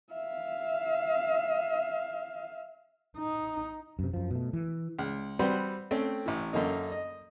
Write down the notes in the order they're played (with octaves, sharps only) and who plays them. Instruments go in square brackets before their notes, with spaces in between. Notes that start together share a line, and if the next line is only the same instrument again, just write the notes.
[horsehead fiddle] E5 F5
[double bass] D#4
[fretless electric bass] F#2 C3
F#2 F3
B2 A3
E3
[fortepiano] C#2
G3 C4 F#4 B4 C5 F#5
A3 C4 C#4 G5
A1 E3
F#2 D3 A#3 D#4
D#5